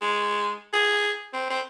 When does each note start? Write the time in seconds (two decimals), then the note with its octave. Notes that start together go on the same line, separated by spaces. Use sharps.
0.02 G#3
0.73 G#4
1.33 C4
1.50 C4